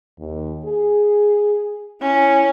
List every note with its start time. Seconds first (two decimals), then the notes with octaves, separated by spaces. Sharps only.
0.18 D#2
0.65 G#4
2.01 C#4 E4